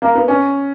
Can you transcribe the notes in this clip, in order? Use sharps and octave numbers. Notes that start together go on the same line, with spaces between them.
A#3
B3
C#4